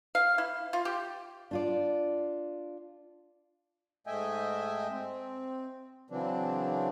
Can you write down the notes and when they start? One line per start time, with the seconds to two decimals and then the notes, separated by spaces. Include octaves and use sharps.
0.15 F5
0.38 E4
0.73 F4
0.85 G4
1.51 D4 F4 D5
4.07 G#2 A3 D#5 E5 G5 G#5
4.90 C4
6.10 C#3 E3 F#3 C4 D4